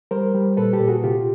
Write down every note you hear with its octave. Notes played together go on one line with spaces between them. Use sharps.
G3 A#4 C5
G3
A#2 A4 B4
G4 A4
A#2
F#4 G#4
C3 F4 G4